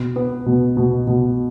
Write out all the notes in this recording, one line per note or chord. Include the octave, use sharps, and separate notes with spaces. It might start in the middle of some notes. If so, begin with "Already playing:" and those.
Already playing: B2
B3
B2
B2
B2